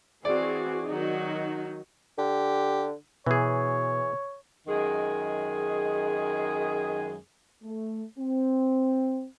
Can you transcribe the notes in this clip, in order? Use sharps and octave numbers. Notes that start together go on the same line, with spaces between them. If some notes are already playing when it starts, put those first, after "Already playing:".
E3 C4 F#4 G#4 D5
D#3 F#3 D#4 F#4
D3 G4
B2 E3 G#4 C#5
F#2 D#3 G#3 G#4
A3
C4